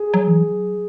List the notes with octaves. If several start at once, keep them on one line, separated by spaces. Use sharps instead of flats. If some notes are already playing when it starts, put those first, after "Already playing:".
Already playing: G#4
F#3
E3
F#3